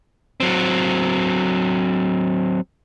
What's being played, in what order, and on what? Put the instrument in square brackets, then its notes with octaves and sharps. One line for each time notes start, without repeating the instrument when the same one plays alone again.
[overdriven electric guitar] F#3 C4